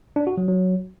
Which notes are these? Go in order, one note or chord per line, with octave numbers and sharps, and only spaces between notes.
D4
F#4
F#3
F#3